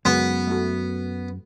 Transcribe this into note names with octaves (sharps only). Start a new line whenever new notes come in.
F#2 C#3 F#3 G#3 B3
A3 F#4